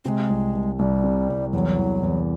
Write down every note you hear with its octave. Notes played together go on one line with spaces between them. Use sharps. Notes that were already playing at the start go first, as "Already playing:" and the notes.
C3 G#3 C4
C2
C2
C2 G3
C3
C2
E2 F#3
E2
E2